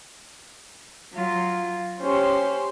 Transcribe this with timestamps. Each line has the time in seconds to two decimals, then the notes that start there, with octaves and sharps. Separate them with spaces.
1.14 F#3 F4
2.02 C#4 G4 C5 C6